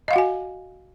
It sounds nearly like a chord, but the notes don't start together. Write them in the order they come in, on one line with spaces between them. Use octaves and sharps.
D#5 F5 F#5 F#4 G#5